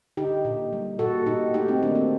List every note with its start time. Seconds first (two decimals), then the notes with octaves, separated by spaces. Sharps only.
0.17 D3 D#4 G4
0.45 A#2
0.73 G3
0.99 A#2 F#4 A4
1.26 A#2 D#4 G4
1.54 A3 D#4 G4
1.68 C4 D#4
1.82 D#3 A#3 D4
1.95 C4